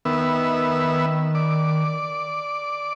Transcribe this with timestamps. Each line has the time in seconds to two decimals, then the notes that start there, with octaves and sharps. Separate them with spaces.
0.05 D#3 B3 E5
1.35 D5